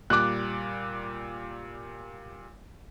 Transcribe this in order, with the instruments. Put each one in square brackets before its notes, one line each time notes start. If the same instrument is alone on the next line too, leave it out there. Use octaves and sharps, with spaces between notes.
[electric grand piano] A#2 G3 [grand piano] D6 F#6